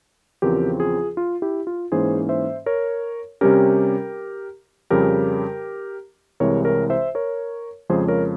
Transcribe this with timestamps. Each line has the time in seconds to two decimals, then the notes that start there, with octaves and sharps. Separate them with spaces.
0.42 E2 C#3 F3 C4 G4 A#4
0.80 F4 G#4
1.17 F4
1.42 E4 G4
1.67 F4
1.92 G#2 E3 A#3 C#4 G#4 C5
2.29 C5 E5
2.66 A#4 C#5
3.41 C3 G3 C#4 G4 A#4
4.90 F2 C#3 G3 G4 A#4
6.40 C2 C3 E3 G#3 C4 A#4 C#5
6.65 A#4 C#5
6.90 C5 E5
7.15 A#4 C#5
7.89 F2 C#3 F3 G#3 G#4 C5
8.08 A#4 C#5